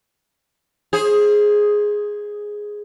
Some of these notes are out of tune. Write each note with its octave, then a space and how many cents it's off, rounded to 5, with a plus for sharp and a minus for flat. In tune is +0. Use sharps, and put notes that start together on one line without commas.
G#4 +0 C5 +30